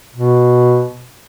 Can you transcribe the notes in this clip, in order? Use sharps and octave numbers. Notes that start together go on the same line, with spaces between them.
B2